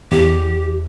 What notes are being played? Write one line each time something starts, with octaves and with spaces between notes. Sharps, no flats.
E2 G4